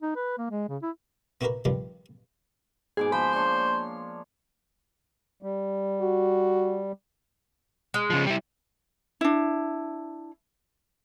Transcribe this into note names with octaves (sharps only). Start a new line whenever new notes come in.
D#4
B4
A#3
G#3
C#3
E4
B3 E4 F#4 G4 A#4 B4
G2 D#3 F3 G3 F4
G#2 B2 G#4 D6
F3 C5 B5
A#3 D4 C#5 C6
G3
F#4
G#3
C#3 F3
G3 E4
D4 E4